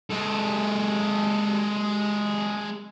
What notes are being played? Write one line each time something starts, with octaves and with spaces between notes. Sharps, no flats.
G#3 A4